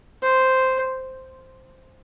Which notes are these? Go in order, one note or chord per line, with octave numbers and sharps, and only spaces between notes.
C5